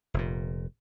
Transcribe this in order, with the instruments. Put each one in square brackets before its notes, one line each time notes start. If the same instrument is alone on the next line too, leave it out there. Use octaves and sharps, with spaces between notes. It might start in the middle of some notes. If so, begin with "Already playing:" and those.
[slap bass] F1 A#2